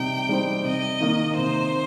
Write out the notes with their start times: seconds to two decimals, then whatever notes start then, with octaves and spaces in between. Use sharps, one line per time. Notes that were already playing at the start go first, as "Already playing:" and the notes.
Already playing: C3 G3 D#4 G5
0.29 G3 D#4 C5
0.65 C3 D#5
1.01 D#3 A#3
1.37 C3 C5